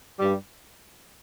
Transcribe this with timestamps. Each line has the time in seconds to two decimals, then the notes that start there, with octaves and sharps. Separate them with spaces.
0.19 G2 G3